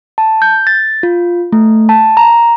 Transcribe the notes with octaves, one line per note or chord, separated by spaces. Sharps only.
A5
G6
A6
F4
A3
A5
A#5